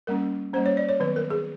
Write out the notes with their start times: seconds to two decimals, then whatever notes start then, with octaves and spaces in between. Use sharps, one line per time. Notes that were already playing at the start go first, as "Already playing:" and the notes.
0.07 G3 A#3 C#4 A#4
0.53 G3 A#3 C#4 C5
0.66 C#5
0.77 D5
0.89 C#5
1.00 D#3 F#3 B3 B4
1.16 A#4
1.30 G#4